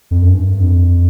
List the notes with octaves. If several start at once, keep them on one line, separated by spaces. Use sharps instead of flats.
F2
F#2
G2
F2